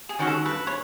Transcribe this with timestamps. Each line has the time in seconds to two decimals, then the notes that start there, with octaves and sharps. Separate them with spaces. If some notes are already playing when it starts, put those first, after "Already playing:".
0.09 G#4
0.19 D#3 G#3 C#4 F#4
0.27 A4
0.45 G2 B4
0.67 C#5